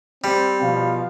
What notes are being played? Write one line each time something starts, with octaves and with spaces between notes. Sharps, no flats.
G3 C4
B2 F3 F5